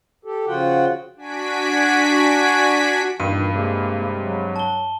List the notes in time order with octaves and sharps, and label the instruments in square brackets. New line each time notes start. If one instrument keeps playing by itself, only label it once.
[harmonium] G4 A4
C#3 F3 F4 F#4 F#5 G5
[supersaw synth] D4 F#4 G#5 B6 D7
[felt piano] G2 [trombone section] A#2 D#3 E3 [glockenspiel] D#7
[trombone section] C3 G#3 [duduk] A#3
[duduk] F#3
[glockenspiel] A5 G7